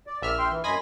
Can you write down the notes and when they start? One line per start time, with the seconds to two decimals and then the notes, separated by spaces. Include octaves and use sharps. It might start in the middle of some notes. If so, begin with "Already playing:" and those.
0.07 D5
0.22 A#1 E5 F6
0.39 G5 C6
0.51 E3
0.64 F#2 D#5 G#5 B5 C6 A#6